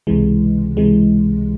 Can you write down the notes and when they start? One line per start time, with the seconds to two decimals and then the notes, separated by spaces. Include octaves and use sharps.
0.07 C#2 C3 E3 G#3
0.77 C#2 C3 E3 G#3